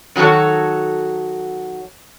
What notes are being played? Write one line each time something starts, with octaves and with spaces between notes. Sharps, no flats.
D#3 F#3 F#4 A4 C#5